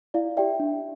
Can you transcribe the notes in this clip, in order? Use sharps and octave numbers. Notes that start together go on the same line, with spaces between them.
E4 D5 F5
G4 D5 E5 G5
D4